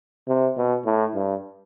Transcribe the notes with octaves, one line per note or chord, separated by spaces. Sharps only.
C3
B2
A2
G2